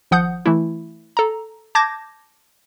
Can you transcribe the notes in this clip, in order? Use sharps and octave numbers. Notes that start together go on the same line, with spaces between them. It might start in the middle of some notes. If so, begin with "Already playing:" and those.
G#1 F3 F#5 D#6 G6
E3 A3 E4
A4 A#5
A5 D6 G6 G#6 A#6